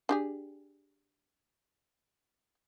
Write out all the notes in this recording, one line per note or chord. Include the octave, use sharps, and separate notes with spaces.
D4 G4 G#4